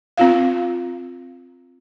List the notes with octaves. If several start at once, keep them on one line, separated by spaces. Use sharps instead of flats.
C4 F4 F5